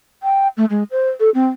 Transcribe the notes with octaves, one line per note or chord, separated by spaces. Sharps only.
G5
A3
G#3
C5
A4
C4